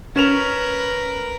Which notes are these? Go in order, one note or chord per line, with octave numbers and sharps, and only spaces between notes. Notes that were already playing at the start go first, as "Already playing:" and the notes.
C#4 A#4 B4 E7 F7